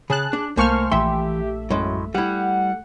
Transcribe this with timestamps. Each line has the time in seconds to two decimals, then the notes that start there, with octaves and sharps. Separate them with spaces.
0.10 C#3 G#4 A5 F#6
0.33 D4
0.57 C2 A3 A#3 C5 F5 G#5 C#6 F6
0.91 A#1 E3 G4 E5 C6
1.70 F#2 A2 G#3
2.14 G3 E4 F#5